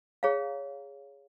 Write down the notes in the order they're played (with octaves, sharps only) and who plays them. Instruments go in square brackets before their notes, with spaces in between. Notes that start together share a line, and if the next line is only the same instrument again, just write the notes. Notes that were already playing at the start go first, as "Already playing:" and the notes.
[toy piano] G#4 C#5 F5 A#5